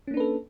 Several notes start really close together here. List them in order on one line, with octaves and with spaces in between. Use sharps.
C#4 A#3 D4 B4 A4